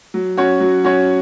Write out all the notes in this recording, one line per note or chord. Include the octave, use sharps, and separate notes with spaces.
F#3
C#4 F#4 C#5
F#3
C#4 F#4 C#5